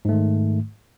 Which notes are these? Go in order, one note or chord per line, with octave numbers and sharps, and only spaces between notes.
G#2 D#3 A3